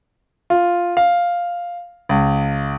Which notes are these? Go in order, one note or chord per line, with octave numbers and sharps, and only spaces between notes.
F4
F5
C#2